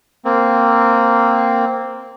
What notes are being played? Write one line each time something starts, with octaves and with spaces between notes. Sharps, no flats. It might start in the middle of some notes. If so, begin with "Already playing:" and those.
A#3 C4